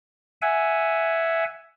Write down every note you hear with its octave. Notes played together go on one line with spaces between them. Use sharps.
E5 F#5 G#5